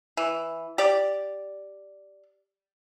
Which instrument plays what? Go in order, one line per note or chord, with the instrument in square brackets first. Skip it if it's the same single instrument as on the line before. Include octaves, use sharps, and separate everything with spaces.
[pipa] E3
G4 D5